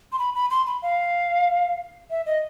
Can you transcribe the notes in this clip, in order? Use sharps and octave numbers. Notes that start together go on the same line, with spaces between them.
C6
B5
B5
C6
B5
F5
E5
D#5